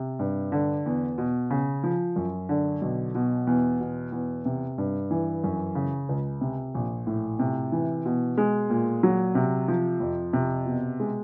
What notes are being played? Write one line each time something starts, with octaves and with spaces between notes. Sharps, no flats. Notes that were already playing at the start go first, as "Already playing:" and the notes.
Already playing: C3
G2
D3
E2
B2
C#3
F3
F#2
D3
B1
B2
E2
B2
E2
C3
G2
E3
F#2
C#3
C#2
C3
A#1
A2
C3
E3
B2
G#3
A#2
F#3
C3
F3
F2
C3
B2
G#3